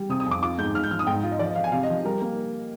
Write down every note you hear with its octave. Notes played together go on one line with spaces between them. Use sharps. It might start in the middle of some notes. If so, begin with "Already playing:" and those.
Already playing: G3
C3 D#6
D#6
F2 D6
F4 D6
G#2 G6
G#2 F6
G6
F3 F6
D#6
G#2 G5
F4
D#5
F3 D5
D#5
F3 F5
G#5
C3 F5
D#5
F3
G3 A#4
A#3